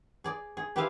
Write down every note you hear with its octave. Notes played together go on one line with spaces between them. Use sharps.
G#4 D5
G#4
G4 B4 C5 E5 F5 G#5